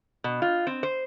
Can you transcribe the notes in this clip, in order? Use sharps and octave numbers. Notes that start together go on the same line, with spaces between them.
B2
F4
C4
C5